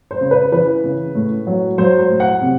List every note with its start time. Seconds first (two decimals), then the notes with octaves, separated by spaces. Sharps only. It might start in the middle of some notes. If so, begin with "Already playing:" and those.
0.11 C5
0.21 C#3
0.31 B4
0.52 E3 B4
0.84 C#3
1.15 A2
1.47 F#3
1.78 F#3 C5
1.99 C5
2.10 A2
2.20 F#5
2.41 C3